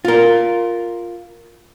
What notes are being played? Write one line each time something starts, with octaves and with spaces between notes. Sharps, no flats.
F4 A#4